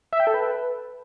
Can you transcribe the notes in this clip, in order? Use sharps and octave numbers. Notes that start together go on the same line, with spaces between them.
E5
G5
A4
B4